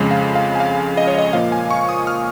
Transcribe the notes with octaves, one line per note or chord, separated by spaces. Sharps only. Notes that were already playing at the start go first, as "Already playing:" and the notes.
Already playing: F2 C#3 G#3
F5
F5
G#5
F5
D#5
C#5
D#5
A#2 F3 A#3 F5
G#5
C#6
D#6
F6